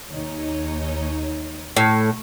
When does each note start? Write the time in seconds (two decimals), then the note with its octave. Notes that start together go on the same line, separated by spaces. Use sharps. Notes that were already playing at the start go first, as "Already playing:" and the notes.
0.12 D#2 D#4 C#5
1.77 A2